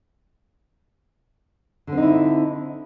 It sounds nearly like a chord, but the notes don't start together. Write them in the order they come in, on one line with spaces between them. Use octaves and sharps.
D3 C4 D#4 E4